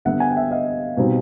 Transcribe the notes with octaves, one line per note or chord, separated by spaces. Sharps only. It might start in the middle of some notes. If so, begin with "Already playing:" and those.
D3 G3 B3 E5 F#5
F#5 G#5
G5
E5 F#5
D#5 F5
B2 G3 C4 D#4